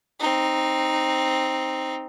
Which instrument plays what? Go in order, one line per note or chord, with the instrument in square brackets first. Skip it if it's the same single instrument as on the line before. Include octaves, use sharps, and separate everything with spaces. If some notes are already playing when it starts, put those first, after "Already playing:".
[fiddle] C4 D#4